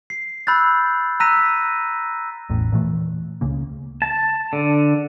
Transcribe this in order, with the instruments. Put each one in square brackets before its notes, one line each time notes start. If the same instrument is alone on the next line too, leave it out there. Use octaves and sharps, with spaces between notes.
[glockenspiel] C7
B5 E6 F#6 G6 A6
A#5 E6 F#6 A#6 B6 D#7
[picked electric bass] A1 E2 A2
A#2 E3 A3
C#2 C#3 A#3
[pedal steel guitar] A5
D3